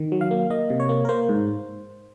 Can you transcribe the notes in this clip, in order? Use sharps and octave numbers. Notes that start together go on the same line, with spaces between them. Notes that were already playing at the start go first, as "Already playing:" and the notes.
Already playing: D#3
F#3
F5
A#3
A#3 D#5
C3
C#5
A#3
A#4
A#3 C5
G#2